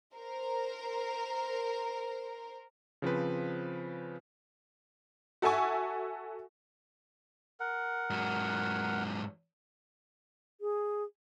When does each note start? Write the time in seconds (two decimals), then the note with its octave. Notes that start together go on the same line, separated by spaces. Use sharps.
0.15 A#4 C5
3.02 C#3 F3 C4 B4
5.42 F#4 A4 E5 G#5 C#6
7.60 A#4 F#5
8.10 G#2 F#3
10.61 G#4